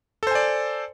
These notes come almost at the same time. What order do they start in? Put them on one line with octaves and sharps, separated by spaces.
A4 C5 G#5 D5